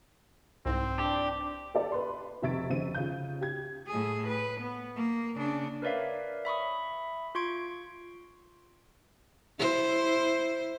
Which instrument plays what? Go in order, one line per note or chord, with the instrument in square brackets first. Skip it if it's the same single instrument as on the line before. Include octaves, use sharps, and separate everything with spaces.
[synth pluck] C2 G#2 [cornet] C4
[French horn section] E3 D4 [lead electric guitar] G4
[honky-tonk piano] G4 A4 A#4 D5 E5
B4 C6
F1 C3 E5 C#6 A6 D7
F1 C#3 C4 E5 D#7
C#3 F4 G6
G4 G#6
[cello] A2 G#4
B4
B3
A#3
C#3 D4
[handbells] A#4 B4 C#5 D5 E5 F5
E5 B5 C#6 D#6
F4 C6 C#6 G#6 D7
[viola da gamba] E4 C5